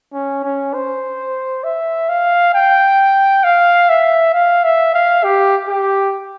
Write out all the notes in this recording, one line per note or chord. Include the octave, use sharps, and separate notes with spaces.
C#4
C#4
C5
E5
F5
G5
F5
E5
F5
E5
F5
G4
G4